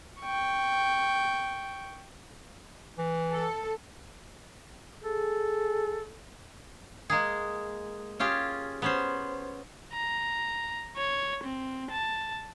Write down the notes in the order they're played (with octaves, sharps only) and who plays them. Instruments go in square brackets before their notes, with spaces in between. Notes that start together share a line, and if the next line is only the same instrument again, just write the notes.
[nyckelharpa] G5 C#6
[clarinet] E3
[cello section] A4
[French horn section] G#4 [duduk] A4
[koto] G#3 A#3 G#4
C#4 F4 G4 G#4
B3 C#4 C5
[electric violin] A#5
C#5
C4
A5